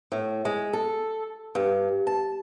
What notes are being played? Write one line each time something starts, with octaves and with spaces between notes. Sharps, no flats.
A2
G#3
A4
G2
A5